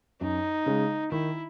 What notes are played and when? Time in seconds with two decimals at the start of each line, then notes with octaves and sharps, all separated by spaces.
0.21 F#2 D#4
0.66 C#3 G#3
1.12 D#3 E4